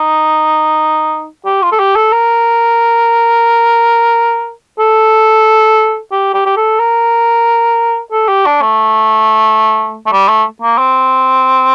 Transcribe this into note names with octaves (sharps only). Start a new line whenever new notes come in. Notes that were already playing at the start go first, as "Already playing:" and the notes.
Already playing: D#4
G4
F4
A4
G4
A4
A#4
A4
G4
G4
G4
A4
A#4
A4
G4
D4
A3
A3
G3
A3
A#3
C4